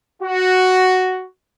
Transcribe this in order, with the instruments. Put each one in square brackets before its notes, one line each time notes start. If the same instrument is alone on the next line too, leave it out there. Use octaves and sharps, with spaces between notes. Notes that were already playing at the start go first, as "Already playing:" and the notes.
[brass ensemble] F#4